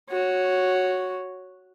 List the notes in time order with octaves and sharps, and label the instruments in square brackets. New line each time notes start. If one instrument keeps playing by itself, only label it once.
[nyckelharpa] F#4 C#5